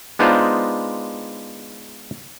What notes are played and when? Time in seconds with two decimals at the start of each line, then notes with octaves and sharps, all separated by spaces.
0.19 G#3 B3 D4 D#4 F4 C5